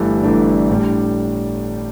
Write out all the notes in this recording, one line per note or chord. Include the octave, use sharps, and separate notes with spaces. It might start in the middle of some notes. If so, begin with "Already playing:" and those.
Already playing: G1 G2 E3 A3 D4
G1 G2 E3 A3 D4
A2 G3 D4